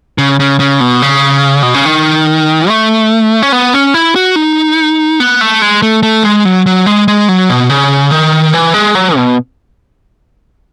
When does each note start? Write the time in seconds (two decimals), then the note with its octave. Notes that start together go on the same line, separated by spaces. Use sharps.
0.18 C#3
0.40 C#3
0.60 C#3
0.81 B2
1.02 C#3
1.63 B2
1.74 C#3
1.86 D#3
2.69 A3
3.43 C#4
3.52 B3
3.74 C#4
3.94 E4
4.16 F#4
4.36 D#4
5.20 B3
5.41 A3
5.62 G#3
5.82 A3
6.03 A3
6.24 G#3
6.45 F#3
6.66 F#3
6.86 G#3
7.08 G#3
7.29 F#3
7.49 B2
7.69 C#3
8.11 D#3
8.53 E3
8.74 G#3
8.95 F#3
9.16 B2